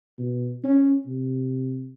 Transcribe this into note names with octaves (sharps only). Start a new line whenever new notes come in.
B2
C#4
C3